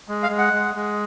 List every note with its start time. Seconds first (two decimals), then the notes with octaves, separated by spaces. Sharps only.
0.08 G#3
0.23 F5
0.30 G#3
0.38 F#5
0.53 G#3
0.76 G#3